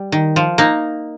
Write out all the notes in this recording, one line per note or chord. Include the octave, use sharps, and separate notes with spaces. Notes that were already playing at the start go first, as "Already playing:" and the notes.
Already playing: G3
D#3
F3
A#3 D#4